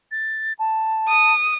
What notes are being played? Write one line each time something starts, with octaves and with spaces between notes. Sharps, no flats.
A6
A5
D#6